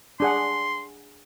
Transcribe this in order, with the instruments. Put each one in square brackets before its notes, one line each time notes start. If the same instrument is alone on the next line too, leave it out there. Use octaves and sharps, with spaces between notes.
[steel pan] D4 G#4 F#5 [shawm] C6